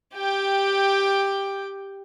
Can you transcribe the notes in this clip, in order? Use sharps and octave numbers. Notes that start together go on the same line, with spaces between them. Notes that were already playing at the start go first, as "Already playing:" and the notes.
G4 G5